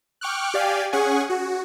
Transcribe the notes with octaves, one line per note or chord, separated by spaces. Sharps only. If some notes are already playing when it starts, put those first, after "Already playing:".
G5 C#6 D6 F6 F#6
G4 D5 F5 G5 G#5
C#4 G#4 F#5 G#5 C#6
F#4